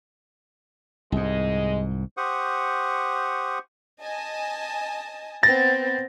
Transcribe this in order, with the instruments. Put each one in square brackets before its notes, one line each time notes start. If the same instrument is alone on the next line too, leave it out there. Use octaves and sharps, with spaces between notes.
[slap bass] C2 G#2 [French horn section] G#3 D#5
[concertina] G4 C5 F#5 C#6 D#6
[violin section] D#5 G#5 A5
[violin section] B3 C4 [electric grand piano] A6 A#6